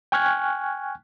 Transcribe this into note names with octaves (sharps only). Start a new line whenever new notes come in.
G5 G#5 C#6 F6 F#6 G#6